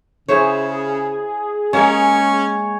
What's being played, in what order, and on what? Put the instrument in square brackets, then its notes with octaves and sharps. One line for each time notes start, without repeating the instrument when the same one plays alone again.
[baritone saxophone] C#3 [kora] E4 C5 C#5 [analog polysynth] G#4
[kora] G#3 A#3 [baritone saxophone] C#4 [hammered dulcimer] C#5 G#5